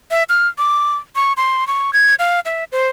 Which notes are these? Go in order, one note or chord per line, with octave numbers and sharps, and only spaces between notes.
E5
F6
D6
C#6
C6
C#6
G#6
F5
E5
C5